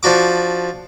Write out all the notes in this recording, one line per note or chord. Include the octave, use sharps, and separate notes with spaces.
F3 D4 F#4 D6